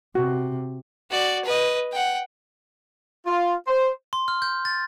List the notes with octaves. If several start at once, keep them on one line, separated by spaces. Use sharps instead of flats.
C3 F#4
F#4 D5
B4 D#5
F#5 G5
F4
C5
C6
F6
G6
A6